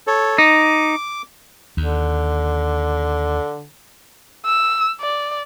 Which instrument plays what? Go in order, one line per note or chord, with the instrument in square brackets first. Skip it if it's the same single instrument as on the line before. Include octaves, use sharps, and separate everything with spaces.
[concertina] A4 C#5
[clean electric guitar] D#4 [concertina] D6
[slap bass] D#2 [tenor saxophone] D3
[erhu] E6
D5